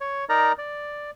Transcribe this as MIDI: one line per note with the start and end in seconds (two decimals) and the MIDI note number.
0.01 0.25 73
0.29 0.52 63
0.29 0.52 70
0.29 0.52 74
0.29 0.52 82
0.58 1.11 74